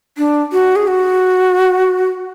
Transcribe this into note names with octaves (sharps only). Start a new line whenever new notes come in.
D4
F#4
G#4
F#4